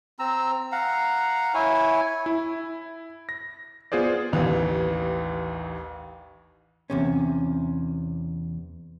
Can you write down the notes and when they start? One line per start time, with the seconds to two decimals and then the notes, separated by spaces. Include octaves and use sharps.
0.19 C4 A#5 E6
0.72 F5 F#5 A#5
1.54 E4 C#5 G#5
2.26 E4
3.29 A#6
3.92 B3 F4 G#4 C5 D5
4.32 A1 D#2 E3
6.90 E2 C3 C#4